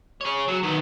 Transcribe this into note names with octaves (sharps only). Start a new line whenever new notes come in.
G#4 C#5
F#3
D#3 B3